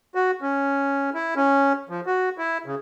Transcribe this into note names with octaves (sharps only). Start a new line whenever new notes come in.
F#4
C#4
E4
C#4
F3
F#4
E4
C#3